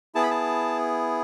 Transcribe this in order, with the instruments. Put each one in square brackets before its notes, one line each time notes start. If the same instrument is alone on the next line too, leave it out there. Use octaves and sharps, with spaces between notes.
[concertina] B3 E4 G#4 A5
B5
A5